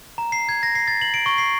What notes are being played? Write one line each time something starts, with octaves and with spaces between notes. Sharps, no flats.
A#5
C7
G#6
A#6
C7
A6
F#7
D7
C#6
C7